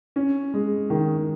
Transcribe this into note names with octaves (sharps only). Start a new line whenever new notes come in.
C#4
G#3
D#3